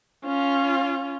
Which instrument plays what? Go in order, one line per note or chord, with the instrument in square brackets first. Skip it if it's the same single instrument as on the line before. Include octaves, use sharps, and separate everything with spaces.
[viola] C#4 F4